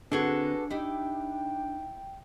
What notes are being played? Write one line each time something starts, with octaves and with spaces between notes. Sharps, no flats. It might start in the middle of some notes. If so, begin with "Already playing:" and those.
D3 C4 D4 F#4 G#4 A4 B4
D#4 E4 G4 G5